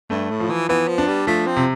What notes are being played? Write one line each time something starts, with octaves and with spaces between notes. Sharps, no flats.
G2 A3
A2
F3
E3
E3 B3
F3
D4
G3
F3 A3
C4
C3